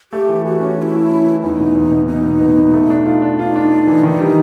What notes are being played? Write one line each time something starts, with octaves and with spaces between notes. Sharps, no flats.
A3 G4
E3
E3 F#4
C#4
C#4 E4 F#4
A3
C#4
E3
E2 D#4
B2
E2
B2
B2 D#4
B2
B2
B2
A3
D4
F4
D4
D#4 F4
D4
D4
E3
D#3
G3